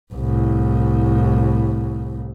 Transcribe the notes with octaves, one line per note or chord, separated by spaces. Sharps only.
C2 A2